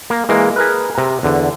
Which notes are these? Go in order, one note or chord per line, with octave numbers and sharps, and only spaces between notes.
A#3
E3 G#3 A#3
G#4 A#4 B4
C3 A#5
E2 D3